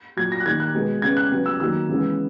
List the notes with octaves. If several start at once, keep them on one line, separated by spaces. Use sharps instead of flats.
A#2 F#3 A#3 G#6
A#6
F#6
D#3 A#3 G#6
F#6
B2 G#3 B3
C#3 G#3 B3 G#6
F#6
C#3 F#3 B3
E6
D#3 F#3 A#3 E6
C#3 E3 G#3 B3